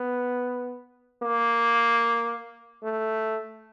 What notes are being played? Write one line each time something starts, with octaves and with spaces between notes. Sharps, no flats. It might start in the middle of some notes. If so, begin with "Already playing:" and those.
Already playing: B3
A#3
A3